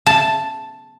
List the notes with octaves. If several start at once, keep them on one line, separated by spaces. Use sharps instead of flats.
A5